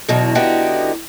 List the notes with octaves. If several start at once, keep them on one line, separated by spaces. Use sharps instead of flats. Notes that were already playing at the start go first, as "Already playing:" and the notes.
E2 B2 D3 F#3 D#4
D3 B3 D#4 E4 F#4 G4